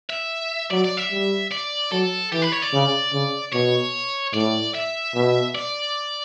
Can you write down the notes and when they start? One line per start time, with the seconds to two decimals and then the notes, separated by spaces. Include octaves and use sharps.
0.10 E5
0.71 F#3 D5
0.84 D5
0.97 E5
1.11 G3
1.52 D5
1.92 F#3 A4
2.32 E3 G4
2.42 B4
2.52 C#5
2.62 D5
2.73 C#3
3.13 C#3
3.53 B2 C#5
4.33 A2 D5
4.74 E5
5.15 B2
5.55 D5